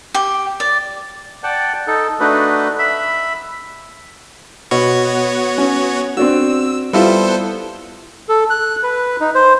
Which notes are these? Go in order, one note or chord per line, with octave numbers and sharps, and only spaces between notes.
G4
D5
D5 F#5 G5 A5
D#4 A4
A3 D4 D#4 F#4 B4
E5 B5
B2 B3 F#4 C#5
C#4
C4 D4 F#4 E6
G3 B3 E4 F4 A4 C5
A4
F#6
B4
D#4
C5